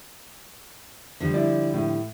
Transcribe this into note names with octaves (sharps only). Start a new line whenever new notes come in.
D3 F3 G3
E4 D5
A2